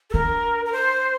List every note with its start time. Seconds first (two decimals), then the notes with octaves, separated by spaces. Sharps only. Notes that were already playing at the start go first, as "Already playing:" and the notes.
0.10 A4
0.14 D4 A#4
0.66 A#4
0.73 C5